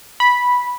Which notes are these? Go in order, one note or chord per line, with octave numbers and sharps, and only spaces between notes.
B5